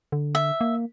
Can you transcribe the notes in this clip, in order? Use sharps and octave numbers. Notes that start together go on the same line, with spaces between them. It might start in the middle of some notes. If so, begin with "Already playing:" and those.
D3
E5
A#3